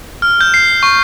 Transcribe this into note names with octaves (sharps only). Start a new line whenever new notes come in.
F6
G6
C7
C#6